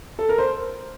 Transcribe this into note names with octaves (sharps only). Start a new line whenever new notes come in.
A4
A#4
C5